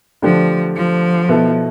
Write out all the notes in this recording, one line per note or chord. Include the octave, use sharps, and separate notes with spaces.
D3 F3 A3 D4 G4
F3
B2 B3 E4 A4